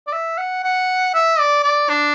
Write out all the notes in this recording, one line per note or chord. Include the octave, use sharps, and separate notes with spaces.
D5
E5
F#5
F#5
E5
D5
D5
D4